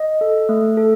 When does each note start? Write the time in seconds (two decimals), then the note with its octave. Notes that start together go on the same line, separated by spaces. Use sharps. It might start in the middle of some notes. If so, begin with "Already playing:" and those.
Already playing: D#5
0.21 A4
0.49 A3
0.77 A4